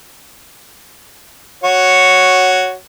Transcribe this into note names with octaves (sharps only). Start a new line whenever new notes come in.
F#4 C#5